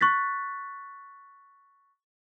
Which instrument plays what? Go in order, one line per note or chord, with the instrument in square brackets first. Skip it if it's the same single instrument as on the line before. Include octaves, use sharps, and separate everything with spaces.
[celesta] C#6 F#6 A6 B6